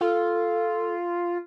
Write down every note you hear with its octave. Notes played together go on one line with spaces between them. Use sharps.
F4 A4